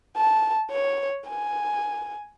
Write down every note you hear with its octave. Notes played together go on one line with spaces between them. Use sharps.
A5
C#5
G#5